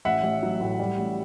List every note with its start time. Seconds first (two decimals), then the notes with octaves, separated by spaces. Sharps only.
0.05 A1 E5 F#5
0.23 A1
0.43 F#3
0.61 A2
0.79 G3
0.98 A1